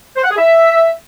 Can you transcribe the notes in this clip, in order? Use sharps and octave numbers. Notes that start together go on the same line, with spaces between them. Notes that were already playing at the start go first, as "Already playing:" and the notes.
C5
F#5
G#4
E5